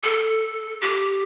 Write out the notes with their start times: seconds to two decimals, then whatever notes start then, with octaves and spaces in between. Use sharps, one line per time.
0.04 A4
0.81 G4